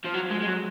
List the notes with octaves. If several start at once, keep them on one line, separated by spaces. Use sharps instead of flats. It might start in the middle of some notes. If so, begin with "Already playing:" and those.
F3
F#3
G#3
G#3
F#3